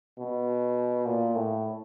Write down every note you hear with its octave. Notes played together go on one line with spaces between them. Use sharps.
B2
A#2
A2